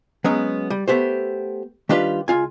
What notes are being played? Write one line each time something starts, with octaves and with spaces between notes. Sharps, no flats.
F#3 G#3 B3 C#4
G3
A3 B3 G4 C5
D#3 G3 D4 F4 G4 B4
C#2 F4 G#5